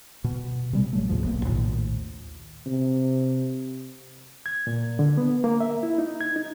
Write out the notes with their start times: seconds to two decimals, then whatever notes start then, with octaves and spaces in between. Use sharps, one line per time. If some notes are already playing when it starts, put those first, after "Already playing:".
0.24 B2
0.73 C3 G3 G#3
0.93 A1 F#3 A3
1.09 D2 G#2 B2 F3
1.24 D#1 B1 A#3
1.45 A#1 D#2 A2 D#3
2.66 C3
4.46 G#6
4.67 A#2
4.99 D3
5.17 B3
5.44 A#3
5.60 E5
5.83 E4
5.98 D#4
6.21 G#6
6.36 D#4